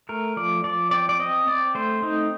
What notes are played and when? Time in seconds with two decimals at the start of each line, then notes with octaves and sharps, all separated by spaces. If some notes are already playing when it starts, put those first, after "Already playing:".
0.09 A3 A#4
0.36 F3 D5
0.64 F3 D5
0.91 C4 D5
1.09 D5
1.19 C4 D#5
1.47 C4 D5
1.75 A3 C5
2.02 C4 D#4